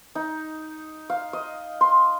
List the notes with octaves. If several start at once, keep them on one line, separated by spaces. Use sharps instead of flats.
D#4
F5
D#5
C6